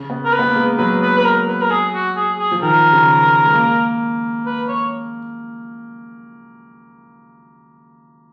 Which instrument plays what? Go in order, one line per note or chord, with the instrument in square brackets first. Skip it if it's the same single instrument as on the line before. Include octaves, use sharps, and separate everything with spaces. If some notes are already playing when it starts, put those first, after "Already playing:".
Already playing: [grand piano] C#3
B3
[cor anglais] A#4
B4
[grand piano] B3
A#3
G#3
[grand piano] F#3 [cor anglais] B4
[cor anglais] B4
B4
A#4
B4
A#4
G#4
F#4
G#4
G#4
[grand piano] F3
[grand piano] D#3 [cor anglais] A#4
[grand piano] C#3
G#3
A#3
[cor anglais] B4
C#5